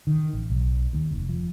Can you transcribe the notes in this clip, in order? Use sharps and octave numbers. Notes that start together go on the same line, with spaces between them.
D#3
A1
B1
D#2
F1
F3